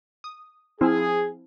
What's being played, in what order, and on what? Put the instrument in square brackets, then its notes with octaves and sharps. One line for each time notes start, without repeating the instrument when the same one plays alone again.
[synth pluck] D#6
[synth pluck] F3 C4 E4 [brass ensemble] G#4